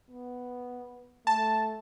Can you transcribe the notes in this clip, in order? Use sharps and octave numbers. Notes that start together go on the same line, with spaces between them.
B3
A3 A5